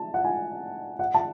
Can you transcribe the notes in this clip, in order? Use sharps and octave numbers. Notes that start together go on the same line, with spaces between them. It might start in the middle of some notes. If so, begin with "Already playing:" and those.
Already playing: A5
F#5
G#5
F#5
A5